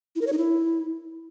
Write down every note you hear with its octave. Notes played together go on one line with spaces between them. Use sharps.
E4
A#4
C#5
D#4
E4